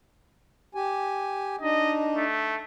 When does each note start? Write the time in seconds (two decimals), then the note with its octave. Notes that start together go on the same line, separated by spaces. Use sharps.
0.75 G4 G#5
1.61 D4 D#4 D#5
2.16 A3